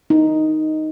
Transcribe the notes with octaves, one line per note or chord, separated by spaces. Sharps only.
D#4